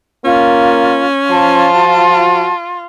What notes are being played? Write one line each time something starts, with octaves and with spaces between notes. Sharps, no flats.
A#3 C#4 F4
F3 F4 A5
F#4